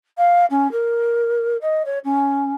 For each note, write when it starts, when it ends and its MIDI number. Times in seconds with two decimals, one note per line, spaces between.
0.17 0.45 77
0.50 0.70 61
0.72 1.57 70
1.61 1.82 75
1.85 1.98 73
2.04 2.55 61